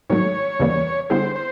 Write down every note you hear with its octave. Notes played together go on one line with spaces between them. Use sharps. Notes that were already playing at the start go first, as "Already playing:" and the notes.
G#2 D#3 F#3 A3 C#5
E2 C#3 E3 G3 A#3
D3 G3 B3 E4 G#4 C5
C5